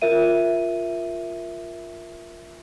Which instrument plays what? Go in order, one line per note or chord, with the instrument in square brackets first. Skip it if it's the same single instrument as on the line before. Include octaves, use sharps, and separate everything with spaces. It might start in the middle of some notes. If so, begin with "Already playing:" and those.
[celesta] F4 A#4 E5 D#7